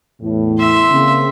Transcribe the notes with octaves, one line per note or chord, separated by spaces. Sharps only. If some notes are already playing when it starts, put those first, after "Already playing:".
E2 A2
E5 C6
C#3 A#3 C4